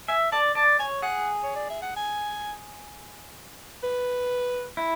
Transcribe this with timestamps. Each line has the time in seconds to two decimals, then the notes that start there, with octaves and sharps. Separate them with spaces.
0.08 E5 G#5
0.32 D5 A5
0.55 D5 A5
0.79 C#5 G#5
1.03 G#4 F#5
1.43 C#5
1.56 D5
1.70 E5
1.82 F#5
1.96 G#5
3.83 B4
4.77 E4